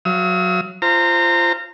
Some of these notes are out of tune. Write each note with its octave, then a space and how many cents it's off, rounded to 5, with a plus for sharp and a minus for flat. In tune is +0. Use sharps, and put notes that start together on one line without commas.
F#3 -15 F5 -40 D#6 +45
F4 -20 C5 +0 A#5 -25